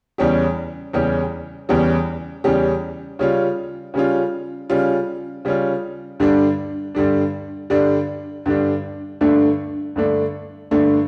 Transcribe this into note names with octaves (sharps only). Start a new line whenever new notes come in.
E2 C#3 G3 C#4 G4
E2 C#3 G3 C#4 G4
E2 C#3 G3 C#4 G4
E2 C#3 G3 C#4 G4
C#3 G3 C#4 F4
C#3 G3 C#4 F4
C#3 G3 C#4 F4
C#3 G3 C#4 F4
G2 D3 G3 D4
G2 D3 G3 D4
G2 D3 G3 D4
G2 D3 G3 D4
G2 D3 A3 D4
G2 D3 A3 D4
G2 D3 A3 D4